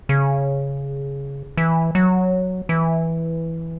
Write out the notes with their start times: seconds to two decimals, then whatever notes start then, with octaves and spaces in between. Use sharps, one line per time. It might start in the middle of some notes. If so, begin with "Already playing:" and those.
0.09 C#3
1.57 E3
1.95 F#3
2.69 E3